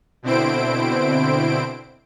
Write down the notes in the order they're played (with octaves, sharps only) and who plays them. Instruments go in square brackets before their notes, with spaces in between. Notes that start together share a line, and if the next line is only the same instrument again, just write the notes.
[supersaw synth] B2 D3 C4 E4 C5 D7